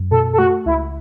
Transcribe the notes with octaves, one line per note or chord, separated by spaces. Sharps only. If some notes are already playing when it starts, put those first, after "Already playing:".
Already playing: F#2
B2 A4
A4
A3 F#4
C#2 E4